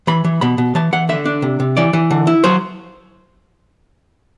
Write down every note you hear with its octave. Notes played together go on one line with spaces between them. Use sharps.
E3 B5
E3
B2 B5
B2
E3 A5
E3 F#5
D3 E5
D4
C3
C3
E3 D5
E3
D3
E4
F#3 C5